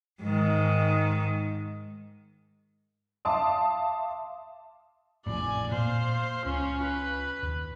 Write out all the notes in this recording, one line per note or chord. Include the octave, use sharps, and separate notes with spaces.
G#2 D#3
E5 F5 A5 C6 D6 D#6
A1 F2 A2 D5 G#5
A#2 A#3 C5 F5
C#2 C#4 F4
B4
D#2